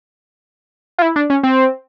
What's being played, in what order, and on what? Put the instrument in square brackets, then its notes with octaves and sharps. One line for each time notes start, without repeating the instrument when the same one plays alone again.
[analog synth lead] F4
E4
D4
C#4
C4